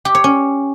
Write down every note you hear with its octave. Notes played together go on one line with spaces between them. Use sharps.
G4
C#5
C#4